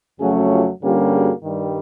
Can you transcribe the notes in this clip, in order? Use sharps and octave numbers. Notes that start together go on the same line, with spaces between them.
F2 C#3 F#3 A3 C#4 F#4 G#4
F4 G4
G2 D3 G3 A#3 C#4 F4 G4
F#4 G#4
G2 D#3 G3